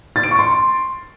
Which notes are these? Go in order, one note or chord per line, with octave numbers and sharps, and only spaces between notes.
A6
D7
C#6
C6